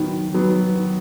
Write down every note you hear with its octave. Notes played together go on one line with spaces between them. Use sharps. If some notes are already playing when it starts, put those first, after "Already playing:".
Already playing: D#3 F#3 B3
F#3 B3
D#3